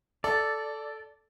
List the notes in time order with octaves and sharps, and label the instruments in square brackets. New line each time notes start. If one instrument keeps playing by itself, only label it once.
[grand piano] A4 [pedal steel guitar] D5